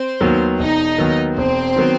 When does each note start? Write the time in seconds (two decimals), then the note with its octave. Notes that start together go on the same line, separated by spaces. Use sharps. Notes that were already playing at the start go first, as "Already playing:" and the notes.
Already playing: C4 C5
0.20 D#2 D#3 F#3 B3
0.59 E1 D#4 D#5
0.98 D#2 D#3 F#3 B3
1.37 E1 C4 C5
1.76 D#3 F#3 B3